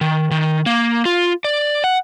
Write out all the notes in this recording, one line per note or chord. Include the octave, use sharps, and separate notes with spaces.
D#3
D#3
A#3
F4
D5
F#5